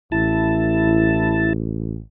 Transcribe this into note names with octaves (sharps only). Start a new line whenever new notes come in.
A1 E4 A5